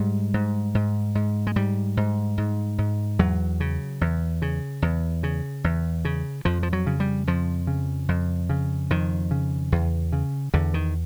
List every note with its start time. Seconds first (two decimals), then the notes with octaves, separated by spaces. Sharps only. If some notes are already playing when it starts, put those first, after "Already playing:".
Already playing: G#2 G3
0.34 G#2
0.75 G#2
1.15 G#2
1.47 G#3
1.56 G#2 G3
1.97 G#2
2.38 G#2
2.78 G#2
3.19 E2 F#3
3.60 C#3
4.01 E2
4.42 C#3
4.82 E2
5.23 C#3
5.64 E2
6.05 C#3
6.45 F2 F3
6.63 F3
6.73 F#3
6.87 C#3
7.00 G3
7.27 F2 F3
7.67 C#3
8.09 F2
8.50 C#3
8.90 F2 D#3
9.31 C#3
9.72 E2
10.13 C#3
10.54 E2 D3
10.74 D#3